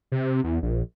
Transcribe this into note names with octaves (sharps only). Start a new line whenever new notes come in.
C3
E2
A#1